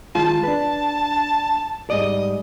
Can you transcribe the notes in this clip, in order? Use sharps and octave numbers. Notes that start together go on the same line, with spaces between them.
D#3 G#3 F4 A5
D4 B4
G#2 G3 D5 D#5